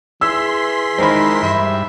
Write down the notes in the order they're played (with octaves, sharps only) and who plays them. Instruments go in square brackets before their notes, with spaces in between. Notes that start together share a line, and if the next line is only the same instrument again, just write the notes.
[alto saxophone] E3 [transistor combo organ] G#4 [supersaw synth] C6 B6 [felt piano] E6
[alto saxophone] D#3 [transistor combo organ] E3 G#3 A#4 [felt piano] C5 B5
[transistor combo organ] G2 [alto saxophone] E5